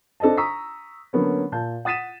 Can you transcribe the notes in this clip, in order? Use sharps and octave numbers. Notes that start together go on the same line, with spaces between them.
D4 A4 C5 D#5 A5
A#5 C#6 D#6 E6 A#6 B6
D3 F#3 A#3 B3 C#4
A#2 F5 A5 G6
F#5 D#6 A6 B6 D#7 E7